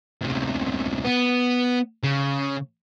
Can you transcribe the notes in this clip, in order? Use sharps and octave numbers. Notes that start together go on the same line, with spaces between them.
D2 C3
B3
C#3